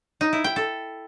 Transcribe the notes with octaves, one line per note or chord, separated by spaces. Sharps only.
D#4
E4
G5
A4